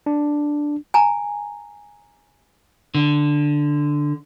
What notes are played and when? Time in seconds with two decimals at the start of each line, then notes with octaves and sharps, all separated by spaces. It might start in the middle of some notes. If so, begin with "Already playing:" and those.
0.06 D4
0.94 G#5 A#5
2.95 D3